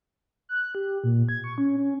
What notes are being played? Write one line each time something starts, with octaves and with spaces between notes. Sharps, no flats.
F#6
G4
A#2
G#6
C#6
C#4
C#4